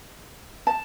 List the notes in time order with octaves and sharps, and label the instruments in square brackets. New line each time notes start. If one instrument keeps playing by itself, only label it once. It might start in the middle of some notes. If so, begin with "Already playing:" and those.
[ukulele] A5